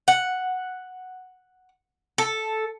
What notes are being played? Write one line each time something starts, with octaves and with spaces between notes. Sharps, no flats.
F#5
A4